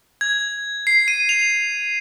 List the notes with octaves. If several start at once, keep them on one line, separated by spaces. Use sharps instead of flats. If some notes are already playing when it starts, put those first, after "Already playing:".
G#6
C7
D#7
F7